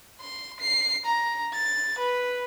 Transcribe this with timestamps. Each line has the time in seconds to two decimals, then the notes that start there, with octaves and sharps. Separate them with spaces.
0.21 C6
0.60 C7
1.05 A#5
1.54 A6
1.98 B4